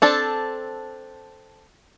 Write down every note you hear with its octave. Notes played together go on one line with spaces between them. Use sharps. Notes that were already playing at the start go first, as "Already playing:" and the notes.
C4 D4 A4